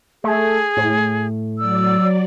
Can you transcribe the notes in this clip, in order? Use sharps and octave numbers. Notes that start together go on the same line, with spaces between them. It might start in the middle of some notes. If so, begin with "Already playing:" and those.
A3 G#4
A2
F#3 D5 E6